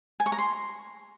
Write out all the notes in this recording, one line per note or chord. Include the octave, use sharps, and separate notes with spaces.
G#5
C#6
A#5
C6